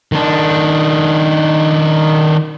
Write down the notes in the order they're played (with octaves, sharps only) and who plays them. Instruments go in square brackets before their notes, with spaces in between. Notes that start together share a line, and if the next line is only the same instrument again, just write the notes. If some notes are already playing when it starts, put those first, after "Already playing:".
[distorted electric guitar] D#3 D4